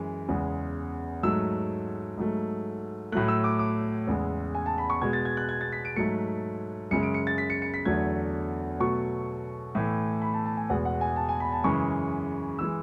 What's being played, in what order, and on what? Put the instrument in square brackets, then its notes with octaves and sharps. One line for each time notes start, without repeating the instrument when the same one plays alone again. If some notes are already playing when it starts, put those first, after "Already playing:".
Already playing: [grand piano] F#2 E3 G#3
E2 C#3 G#3
G#2 F#3 A3 E6
G#2 F#3 A3
A2 F#3 A3 F#6
E6
D6
D6
E2 C#3 G#3
G#5
A5
B5
C#6
B2 G#3 G#6
A6
G#6
F#6
G#6
A6
B6
D7
G#2 F#3 A3 C#7
F#2 C#3 G#3 C#7
D7
C#7
A6
B6
C#7
C#7
B6
E2 D3 F#3 A3 G#6
B2 F#3 A3 C#6
A2 E3 A3
B5
A5
A5
G#5
E2 B2 G#3 F#5
F#5
G#5
A5
G#5
B5
A5
F#2 C#3 E3 G#3 C#6
E3 G#3 E6